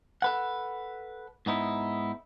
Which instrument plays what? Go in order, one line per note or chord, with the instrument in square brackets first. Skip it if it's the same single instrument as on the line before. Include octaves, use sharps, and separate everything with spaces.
[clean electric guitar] A4 B4 F#5
G#2 B3 D#4 E4